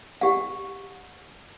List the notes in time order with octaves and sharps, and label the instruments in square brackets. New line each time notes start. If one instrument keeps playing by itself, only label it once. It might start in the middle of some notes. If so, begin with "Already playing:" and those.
[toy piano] G4 F#5